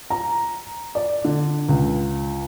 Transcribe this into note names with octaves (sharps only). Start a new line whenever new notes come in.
A#5
D5
D3
C#2